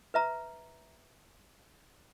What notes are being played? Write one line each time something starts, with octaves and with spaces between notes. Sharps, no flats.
B4 E5 A#5